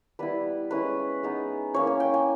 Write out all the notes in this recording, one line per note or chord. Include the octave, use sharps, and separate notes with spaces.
G3 B3 E4 B4
G#3 C#4 E4 B4
G#3 B3 D#4
A#3 C#4 E4 C#5
G#5
G5
G#5